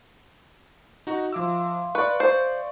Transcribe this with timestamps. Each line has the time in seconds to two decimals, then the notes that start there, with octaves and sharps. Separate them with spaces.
1.07 D#4 F#4
1.33 F3 E5 F5 C6 D6 E6
1.95 B4 D5 C#6
2.20 C5